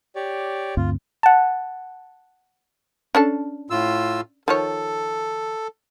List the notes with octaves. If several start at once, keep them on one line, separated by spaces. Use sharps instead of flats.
G4 C#5 D5
D2 G2 C4 F4
F#5 A5
C#4 D4 A4
A2 F4 E6
D#3 F3 A4 C#5